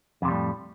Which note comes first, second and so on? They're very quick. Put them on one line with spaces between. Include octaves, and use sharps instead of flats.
F2 C3 G3 A2